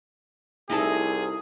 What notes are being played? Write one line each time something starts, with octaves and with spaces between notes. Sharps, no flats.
C2 D#4 E4 G#4 A4